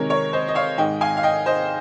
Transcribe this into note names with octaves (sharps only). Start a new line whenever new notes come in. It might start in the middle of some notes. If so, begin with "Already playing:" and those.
Already playing: C3 D#3 G#3 A#4 C#5
A#4 C#5
C5 D#5
D#5
C#5 F5
G#2 D#3 G#3 D#5 G5
F5 G#5
F5
D#5 G5
C5 D#5